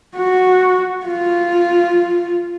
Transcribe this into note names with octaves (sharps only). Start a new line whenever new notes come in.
F#4
F4